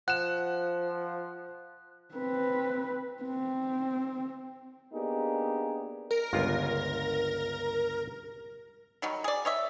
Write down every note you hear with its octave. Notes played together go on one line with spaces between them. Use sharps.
F3 F#5 F#6 E7
C4 B4
C4
A#3 B3 D4 D#4 G4 G#4
A#4
G1 C#2 F4
D#3 F#3 G3
G#4 D5
C#5 D#5 E5